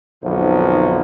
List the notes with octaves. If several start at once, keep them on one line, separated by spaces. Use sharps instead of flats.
B1 F2 D3 D#3 F3